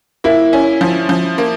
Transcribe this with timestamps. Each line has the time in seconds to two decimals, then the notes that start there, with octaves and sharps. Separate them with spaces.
0.24 A#3 E4
0.53 C#4
0.81 F3
1.09 F3
1.38 A#3